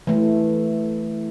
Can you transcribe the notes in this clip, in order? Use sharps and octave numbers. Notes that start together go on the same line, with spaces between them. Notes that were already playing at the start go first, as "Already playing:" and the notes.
E3 A3